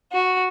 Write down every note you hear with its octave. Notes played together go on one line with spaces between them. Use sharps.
F#4